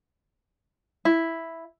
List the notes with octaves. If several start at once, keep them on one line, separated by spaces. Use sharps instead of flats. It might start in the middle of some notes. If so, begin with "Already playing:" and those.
E4